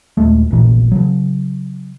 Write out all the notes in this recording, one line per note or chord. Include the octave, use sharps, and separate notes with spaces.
D#1 G#3 A3
F1 A#1 A#2 E3
C#3 F#3